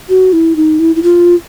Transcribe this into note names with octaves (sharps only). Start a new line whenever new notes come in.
F#4
E4
D#4
E4
E4
F4